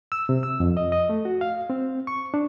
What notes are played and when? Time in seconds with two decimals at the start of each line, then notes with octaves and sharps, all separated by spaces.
0.12 E6
0.29 C3
0.43 E6
0.60 F2
0.77 D#5
0.92 D#5
1.09 A3
1.25 F#4
1.41 F5
1.70 C4
2.07 C#6
2.34 D4